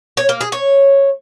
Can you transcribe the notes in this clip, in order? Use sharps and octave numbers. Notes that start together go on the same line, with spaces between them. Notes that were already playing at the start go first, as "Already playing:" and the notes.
C#5
A#3
G#4
C#5